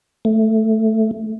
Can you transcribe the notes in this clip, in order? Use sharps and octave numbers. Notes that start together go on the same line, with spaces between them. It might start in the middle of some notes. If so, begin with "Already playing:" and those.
A3